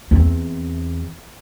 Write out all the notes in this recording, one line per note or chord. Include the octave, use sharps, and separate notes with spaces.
E2 C4